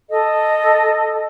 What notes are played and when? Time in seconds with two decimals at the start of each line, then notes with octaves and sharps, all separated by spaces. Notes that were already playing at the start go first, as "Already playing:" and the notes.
0.09 A4 D#5